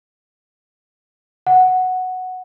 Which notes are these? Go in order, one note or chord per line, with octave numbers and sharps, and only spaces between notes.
F#5